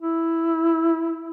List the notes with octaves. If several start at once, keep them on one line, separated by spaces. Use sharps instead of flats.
E4